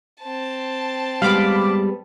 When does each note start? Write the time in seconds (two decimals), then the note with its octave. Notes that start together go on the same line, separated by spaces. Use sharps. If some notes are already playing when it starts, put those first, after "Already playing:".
0.22 C4 A5
1.22 G3 G#3 B3 F5 B5 D6